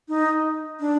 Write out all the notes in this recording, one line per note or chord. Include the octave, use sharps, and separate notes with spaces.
D#4
D4